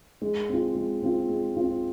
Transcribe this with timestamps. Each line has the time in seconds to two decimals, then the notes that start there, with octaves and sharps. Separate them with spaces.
0.22 G#3
0.49 C4 F4
0.75 G#3
1.02 C4 F4
1.29 G#3
1.56 C4 F4